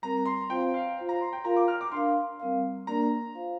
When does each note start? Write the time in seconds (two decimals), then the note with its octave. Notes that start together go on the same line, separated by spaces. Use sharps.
0.02 G3 C4 A#4 A#5
0.26 C6
0.49 C4 F4 C5 F5 G5
0.74 F5
0.97 F4 C5 F5
1.09 A#5
1.21 C6
1.33 G5
1.44 F4 A#4 F5 A#5
1.56 D6
1.68 F6
1.81 D6
1.92 D4 A#4 F5 C6
2.40 G3 C4 A#4 F5
2.87 A#3 D4 A#4 D5 A#5
3.35 F4 C5 F5